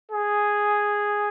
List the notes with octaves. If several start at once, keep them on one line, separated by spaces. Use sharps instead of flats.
G#4